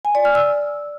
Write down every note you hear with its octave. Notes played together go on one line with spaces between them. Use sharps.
G#5
D5
F6
E6